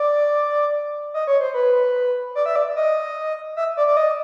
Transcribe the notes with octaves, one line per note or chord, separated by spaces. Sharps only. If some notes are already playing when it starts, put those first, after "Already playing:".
Already playing: D5
D#5
C#5
C5
B4
D5
E5
D5
D#5
E5
D5
D5
D#5